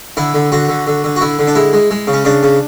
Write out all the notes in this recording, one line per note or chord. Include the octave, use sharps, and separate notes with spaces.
D3 E4
D3
D3 F#4
D3
D3
D3
F#4
D3 E4
D3
D4
G#3 E4
G#3
G#3
C#3
C#4
C#3 D4
C#3